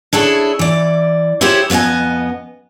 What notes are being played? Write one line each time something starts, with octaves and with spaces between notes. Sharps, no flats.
D4 E4 G#4 A4 C#5
E3 D5
E4 F4 G4 G#4 C5 C#5
F2 B3 F4 D#5 G#5